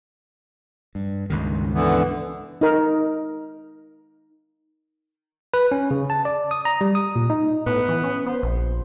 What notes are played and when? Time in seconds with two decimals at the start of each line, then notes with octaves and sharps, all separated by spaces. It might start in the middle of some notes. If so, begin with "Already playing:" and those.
0.95 G2
1.30 C#2 G2 D#3
1.74 D3 E3 B3
2.61 D#4 A#4
5.54 B4
5.72 C#4
5.91 C#3
6.10 A5
6.25 D5
6.51 D#6
6.65 A#5
6.81 G3
6.95 D#6
7.16 A#2
7.30 D#4
7.66 A2 B3
7.88 E3
8.04 C#4
8.26 B3 C5
8.43 A#1